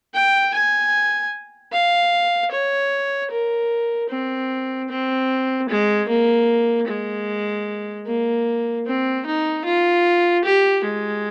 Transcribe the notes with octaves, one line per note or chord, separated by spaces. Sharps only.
G5
G#5
F5
C#5
A#4
C4
C4
G#3
A#3
G#3
A#3
C4
D#4
F4
G4
G#3